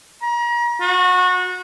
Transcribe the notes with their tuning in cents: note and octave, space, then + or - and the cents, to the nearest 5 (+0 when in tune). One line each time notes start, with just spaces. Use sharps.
A#5 +35
F#4 -25